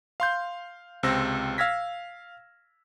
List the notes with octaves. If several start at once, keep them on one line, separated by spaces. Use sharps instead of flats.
F5 C6 G6
C#2 C3 C4 C5 E6 A#6
F5 E6 F6 G#6 A#6 B6